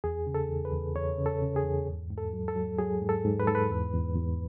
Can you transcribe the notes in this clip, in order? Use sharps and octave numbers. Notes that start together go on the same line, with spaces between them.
E2 G#4
C#3
A4
E2
B4
E2
E2 C#5
C#3
A4
C#3
G#4
E2
G#2
G#2
A4
F#3
A4
F#3
F#3 G#4
G#2
A4
G#2
B4
G#2 A4
B4
E2
E2
E2